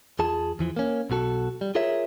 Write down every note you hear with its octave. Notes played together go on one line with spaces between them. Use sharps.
E2 F4 G#4 A5
E2 E3 F3
A#3 C#4
B1 B2 F#4 A4
G3
F4 G#4 A#4 C#5 E5